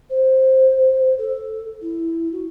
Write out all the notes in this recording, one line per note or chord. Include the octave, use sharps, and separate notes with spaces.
C5
A4
E4
F#4